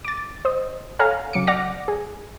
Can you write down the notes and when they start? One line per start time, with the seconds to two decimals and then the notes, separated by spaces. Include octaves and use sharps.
0.04 D6 A6
0.45 C5 D#5
0.99 A4 C#5 F5 F#5 G#5 A#5
1.33 C#2 F#3 D6 C#7
1.47 D5 F#5 D6 F6 A#6
1.88 G#4